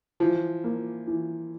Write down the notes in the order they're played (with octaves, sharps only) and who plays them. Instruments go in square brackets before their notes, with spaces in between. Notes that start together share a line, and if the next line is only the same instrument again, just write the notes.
[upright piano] E3 [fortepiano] F3
[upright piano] A#3
E3